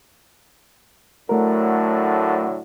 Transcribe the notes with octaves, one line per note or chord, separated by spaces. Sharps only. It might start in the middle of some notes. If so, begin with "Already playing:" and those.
A2 D3 F#3 A3 A#4